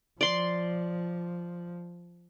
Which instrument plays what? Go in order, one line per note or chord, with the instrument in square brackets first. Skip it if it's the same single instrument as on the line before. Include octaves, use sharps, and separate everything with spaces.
[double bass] F3 [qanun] D5 C6